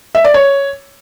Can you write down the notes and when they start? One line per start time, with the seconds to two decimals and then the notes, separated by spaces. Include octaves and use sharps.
0.15 E5
0.24 D5
0.34 C#5